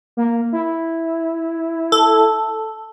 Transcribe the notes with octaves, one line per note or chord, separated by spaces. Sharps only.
A#3
E4
A4